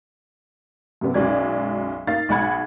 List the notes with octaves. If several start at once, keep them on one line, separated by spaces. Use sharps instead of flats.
F#2 C3 B3
B1 F#2 F#3 G#3 D5 G#6
A#3 D#4 F5 A6
B1 G#3 F#5 B5 G#6